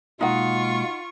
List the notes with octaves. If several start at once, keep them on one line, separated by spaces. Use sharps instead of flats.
B2 G#3 A#3 D#4 F4 F#5 C#6